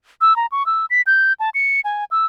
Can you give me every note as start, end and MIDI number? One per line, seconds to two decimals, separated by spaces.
0.21 0.36 88
0.36 0.46 82
0.52 0.66 85
0.66 0.86 88
0.90 1.02 95
1.07 1.33 91
1.40 1.50 81
1.54 1.81 97
1.85 2.04 80
2.11 2.26 88